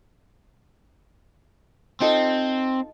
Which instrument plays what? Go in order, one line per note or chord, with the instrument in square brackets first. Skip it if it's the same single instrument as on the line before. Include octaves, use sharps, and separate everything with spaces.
[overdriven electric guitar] C4 [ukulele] D#4 F4 A4